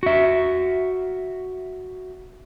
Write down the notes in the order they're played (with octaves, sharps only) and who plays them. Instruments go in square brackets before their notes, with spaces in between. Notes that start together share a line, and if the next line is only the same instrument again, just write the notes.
[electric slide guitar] F#4 E5